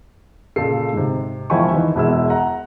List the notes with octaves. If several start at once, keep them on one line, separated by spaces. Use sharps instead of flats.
A#2 C#3 A4 C7
G#2 C3
E1 F3 E4 G5 G#5 C#6
D#3 E3 B4
E1 B2 E4 G#4 E6
F#5 A#5